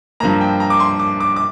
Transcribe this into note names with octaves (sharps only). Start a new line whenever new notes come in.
G2 F3 A#3 A#5
G5
A#5
D6
C6
D6
D6
D6